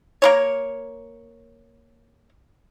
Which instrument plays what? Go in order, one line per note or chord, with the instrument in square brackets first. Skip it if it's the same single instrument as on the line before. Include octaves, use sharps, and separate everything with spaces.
[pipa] A#3 A#4 C#5